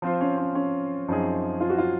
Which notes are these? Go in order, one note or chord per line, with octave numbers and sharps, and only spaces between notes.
F3 C4 F4 C5
C#4
C#4
C#4
F#2 F3 C4 D#4 G#4
F4
F#4
F4